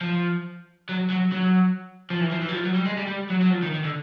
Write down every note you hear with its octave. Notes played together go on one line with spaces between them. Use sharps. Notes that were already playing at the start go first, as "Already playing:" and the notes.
F3
F#3
F#3
F#3
F3
E3
F3
E3
F#3
F3
F#3
G3
G#3
G3
G3
F#3
F#3
F3
D#3
D#3
D3